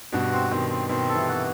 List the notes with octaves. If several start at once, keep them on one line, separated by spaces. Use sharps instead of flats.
G2 B2 F#4
C4
B2 D#3 C4
C4
B2 D#3 C4
A4
C3 E3
F#4